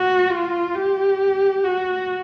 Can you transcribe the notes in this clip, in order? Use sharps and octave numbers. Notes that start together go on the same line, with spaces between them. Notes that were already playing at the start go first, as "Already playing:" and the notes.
Already playing: F#4
F4
G4
F#4